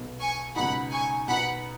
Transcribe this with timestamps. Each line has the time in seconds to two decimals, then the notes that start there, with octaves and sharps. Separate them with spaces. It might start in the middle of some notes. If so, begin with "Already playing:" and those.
Already playing: B1 B2 B3
0.20 G#5 C#6
0.56 C#2 B2 F#3 D#4 F#5 B5
0.92 G#5 C#6
1.28 B2 B3 D#4 B4 F#5 B5